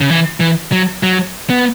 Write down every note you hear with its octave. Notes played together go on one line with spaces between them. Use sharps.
C#3
E3
E3
F#3
F#3
B3